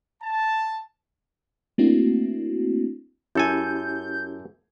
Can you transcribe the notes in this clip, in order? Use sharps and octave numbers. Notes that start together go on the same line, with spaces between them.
A5
A3 A#3 C4 D4 E4 F#4
F#2 C#4 E4 G4 A4 G#5 G6